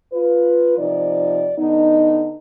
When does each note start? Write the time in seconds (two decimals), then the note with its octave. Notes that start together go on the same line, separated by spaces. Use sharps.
0.13 F4 B4
0.78 C3 F3 D#4 D5
1.58 D3 B3 D#4